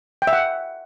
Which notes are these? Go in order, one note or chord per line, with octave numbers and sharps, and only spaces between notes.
G5
E5
F#5